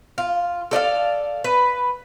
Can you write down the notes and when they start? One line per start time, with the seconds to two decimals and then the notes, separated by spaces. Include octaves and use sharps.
0.18 F4
0.71 A4 D5 D#5 F5
1.44 B4